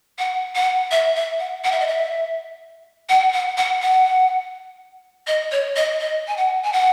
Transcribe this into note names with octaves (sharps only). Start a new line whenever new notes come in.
F#5
F#5
E5
E5
F#5
F#5
E5
D#5
E5
F#5
F#5
F#5
F#5
D#5
C#5
D#5
D#5
G#5
F#5
G#5
F#5